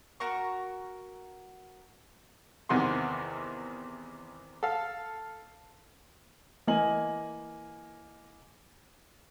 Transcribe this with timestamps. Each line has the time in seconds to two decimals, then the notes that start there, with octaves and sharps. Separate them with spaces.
0.20 F#4 A#4 A#5 C#6
2.69 E2 C3 D#3 F#5 C6
4.63 A4 F5
6.67 E3 A#3 D#5 G#5 F#7